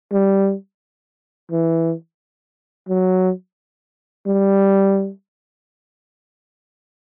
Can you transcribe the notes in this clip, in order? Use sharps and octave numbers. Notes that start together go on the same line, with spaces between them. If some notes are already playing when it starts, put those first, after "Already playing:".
G3
E3
F#3
G3